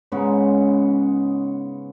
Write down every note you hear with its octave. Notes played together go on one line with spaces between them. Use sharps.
G#2 C#3 G#3 B3